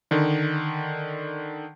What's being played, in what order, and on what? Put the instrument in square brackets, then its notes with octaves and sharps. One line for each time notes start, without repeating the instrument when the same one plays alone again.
[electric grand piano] D3 D#3